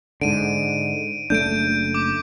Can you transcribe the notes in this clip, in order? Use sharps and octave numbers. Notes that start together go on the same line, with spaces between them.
G#2 D3 D7 D#7
F#1 A3 D4 G6 D7
D6